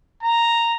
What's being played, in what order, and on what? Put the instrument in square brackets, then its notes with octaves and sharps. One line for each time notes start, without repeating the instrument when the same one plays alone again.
[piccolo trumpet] A#5